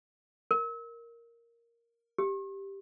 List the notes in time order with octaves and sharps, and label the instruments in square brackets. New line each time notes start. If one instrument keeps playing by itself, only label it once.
[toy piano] A#4
G4